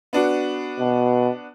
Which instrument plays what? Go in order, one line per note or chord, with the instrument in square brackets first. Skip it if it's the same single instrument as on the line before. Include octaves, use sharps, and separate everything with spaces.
[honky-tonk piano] B3 D4 F#4
[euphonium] B2